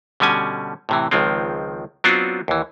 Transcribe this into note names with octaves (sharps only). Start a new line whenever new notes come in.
B2 D3 G3 C#4 G#5
A2 C3 E3
C#2 D#3 F3 G#3 C4
F#3 B3 C4 D4 F4 F#4
D#2 E3